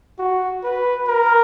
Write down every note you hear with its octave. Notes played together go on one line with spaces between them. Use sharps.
F#4
B4
A#4